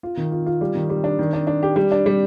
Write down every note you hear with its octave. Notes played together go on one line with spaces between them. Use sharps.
F4
D#3
F4
F4
G3
D#3
G3
D4
D#3
D4
D4
G4
G3
D4
G3